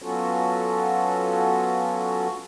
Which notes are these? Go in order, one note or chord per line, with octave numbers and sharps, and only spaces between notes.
F#3 B3 C#4 F4 F#4 A4